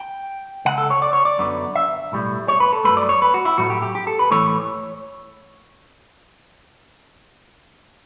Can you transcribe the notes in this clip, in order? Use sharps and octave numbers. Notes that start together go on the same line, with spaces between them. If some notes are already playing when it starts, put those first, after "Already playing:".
Already playing: G5
C#2 C#3 F#5
A4
C#5
D5
C#5
D5
F#2 D3 F#3 B3
E5
B1 A2 G3
C#5
B4
A4
G2 F#3 A3 B4
D5
C#5
B4
F#4
E4
A2 F#3 A3 F#4
G4
G4
G4
A4
B4
A2 E3 A3 C#5